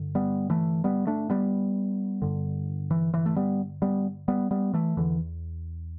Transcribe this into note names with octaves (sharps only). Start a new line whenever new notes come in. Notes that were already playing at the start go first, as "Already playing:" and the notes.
Already playing: G2 D3
G3 B3
E3 A3
G3 B3
A3 D4
G3 B3
G2 D3
E3
E3
A3
G3 B3
G3 B3
G3 B3
G3 B3
E3 A3
E2 D3 E3